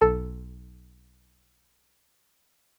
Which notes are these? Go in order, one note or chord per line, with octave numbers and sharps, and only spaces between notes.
B1 A4